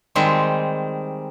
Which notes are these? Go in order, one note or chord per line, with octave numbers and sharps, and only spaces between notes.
D#3 G3 G#3 C4